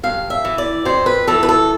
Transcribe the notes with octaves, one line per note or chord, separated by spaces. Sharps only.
G2 F5
E5
E3
D5
F2 C5
B4
E3 A4
B4
A4